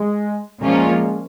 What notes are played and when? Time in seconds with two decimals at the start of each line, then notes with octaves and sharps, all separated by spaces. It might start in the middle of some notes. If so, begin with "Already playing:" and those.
Already playing: G#3
0.62 A#2 F3 G#3 A#3 C#4 F4